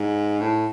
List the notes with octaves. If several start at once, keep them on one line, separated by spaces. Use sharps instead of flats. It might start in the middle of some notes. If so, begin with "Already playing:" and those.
Already playing: G#2
A2